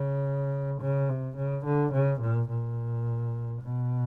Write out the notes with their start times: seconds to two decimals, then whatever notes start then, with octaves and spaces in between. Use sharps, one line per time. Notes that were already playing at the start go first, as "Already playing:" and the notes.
Already playing: C#3
0.81 C#3
1.09 C3
1.37 C#3
1.65 D3
1.93 C#3
2.21 A#2
2.49 A#2
3.61 B2